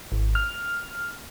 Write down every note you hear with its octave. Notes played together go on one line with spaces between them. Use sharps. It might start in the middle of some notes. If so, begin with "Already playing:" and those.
G#1
F6